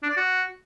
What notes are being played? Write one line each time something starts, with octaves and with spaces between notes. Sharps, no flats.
D4
D5
F#4